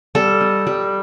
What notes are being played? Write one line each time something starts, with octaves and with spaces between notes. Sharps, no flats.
G3 A4
D#4
G3